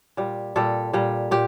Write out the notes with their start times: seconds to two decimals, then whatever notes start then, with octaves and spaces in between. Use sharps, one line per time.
0.17 A#2 G3
0.56 A#2 G3 A4
0.93 A#2 G3
1.31 A#2 G4